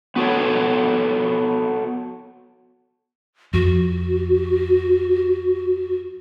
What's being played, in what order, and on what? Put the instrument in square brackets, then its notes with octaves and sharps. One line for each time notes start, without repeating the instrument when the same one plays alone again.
[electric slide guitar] B3 F#4 A4 C#5
[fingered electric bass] F2 [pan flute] F#4